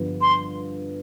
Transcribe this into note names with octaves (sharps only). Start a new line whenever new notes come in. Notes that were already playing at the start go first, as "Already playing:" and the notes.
Already playing: G2 D3 F3 B3
C6